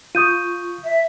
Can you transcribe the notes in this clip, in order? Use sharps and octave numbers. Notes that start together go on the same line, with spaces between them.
F4 C#6 D#6 G6 D#7
E5